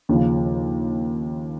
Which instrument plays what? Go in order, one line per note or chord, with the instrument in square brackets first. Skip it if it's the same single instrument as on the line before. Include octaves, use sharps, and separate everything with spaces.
[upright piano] D#2 C#3 F3